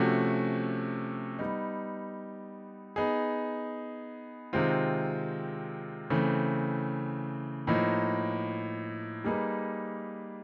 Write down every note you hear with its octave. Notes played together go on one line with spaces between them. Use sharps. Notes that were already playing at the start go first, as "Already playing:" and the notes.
Already playing: C3 F3 A3 C#4 F#4
G3 B3 D#4
B3 D#4 G#4
C3 D#3 G#3 C4 F4
C#3 E3 A3 C4
A2 F3 A#3 D#4
G3 A#3 D#4 G#4 B4